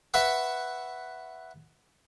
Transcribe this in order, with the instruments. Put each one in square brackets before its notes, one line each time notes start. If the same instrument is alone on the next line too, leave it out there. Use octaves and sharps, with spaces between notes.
[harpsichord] B4 E5 F#5 C#6